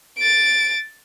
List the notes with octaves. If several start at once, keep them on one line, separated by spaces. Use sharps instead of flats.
A6 D7